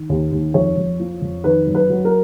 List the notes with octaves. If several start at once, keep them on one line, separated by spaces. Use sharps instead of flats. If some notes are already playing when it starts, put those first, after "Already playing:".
Already playing: D#3
D#2
D#2
F2 C#5
F2
F3
F2
D#3 B4
F#2
B4
F#3
A#4